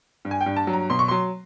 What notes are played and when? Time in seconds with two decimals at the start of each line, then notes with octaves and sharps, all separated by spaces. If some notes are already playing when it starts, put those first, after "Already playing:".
0.25 G2
0.31 G#5
0.41 G5
0.46 G2
0.56 A5
0.67 F#3
0.73 A#5
0.90 B2 C6
0.99 C#6
1.08 F#3 C6